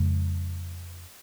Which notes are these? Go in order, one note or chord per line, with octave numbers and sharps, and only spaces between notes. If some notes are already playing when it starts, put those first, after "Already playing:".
Already playing: F2 C#3 G#3